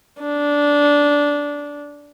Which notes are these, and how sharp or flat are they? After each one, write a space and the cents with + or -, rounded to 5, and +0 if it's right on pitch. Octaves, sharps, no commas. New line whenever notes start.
D4 -15